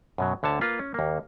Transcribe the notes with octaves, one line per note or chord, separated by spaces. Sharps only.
F#2 B2 F#3
D2 D3 C#5 A5
A#3 F4 B4
C#4
D#2 A#3